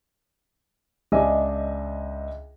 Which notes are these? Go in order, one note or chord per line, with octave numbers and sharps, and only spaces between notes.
C#2 D4 D#5 E5 G#5 E6